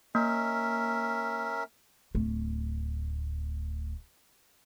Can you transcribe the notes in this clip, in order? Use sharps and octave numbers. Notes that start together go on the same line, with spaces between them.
A#3 C#4 A#4 E5
D1 A3